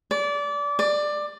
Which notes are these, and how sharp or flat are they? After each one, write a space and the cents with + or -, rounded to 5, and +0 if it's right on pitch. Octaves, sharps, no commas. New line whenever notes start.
D5 -25
D5 +15